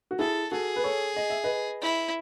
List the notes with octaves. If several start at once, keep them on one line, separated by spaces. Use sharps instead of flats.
F#4
E4 G#4 A4
F#4 G#4 A4
B4
A4 C#5
D#5
E5
B4 D#5
E4